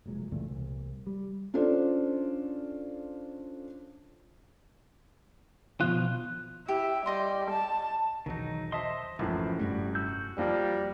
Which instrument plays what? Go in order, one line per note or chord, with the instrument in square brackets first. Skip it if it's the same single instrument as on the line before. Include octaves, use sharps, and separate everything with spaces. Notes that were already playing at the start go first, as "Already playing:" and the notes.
[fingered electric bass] F1 A#2 F#3 G#3
C#2 A#2 E3 A3
C2
G3
[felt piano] C#4 D4 F4 A4 C5 D5
[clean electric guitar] B2 F3 F4 [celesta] F#6
[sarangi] E4 [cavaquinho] G4
[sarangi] G3 [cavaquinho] D5 D#5 C6
[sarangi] A5
[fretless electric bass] B1 E2 [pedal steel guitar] D#3 F#3 D#4
[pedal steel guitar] C5 E5 C6 [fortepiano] D#5 A5
[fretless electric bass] E1 A#1 [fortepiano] F#2 A2 [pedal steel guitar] E3 F3
[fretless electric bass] F1 G2 A3 [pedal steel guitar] G3 F#4
[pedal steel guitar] F#4 E6 G6
[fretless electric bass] F2 [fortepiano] F3 A#3 [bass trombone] G3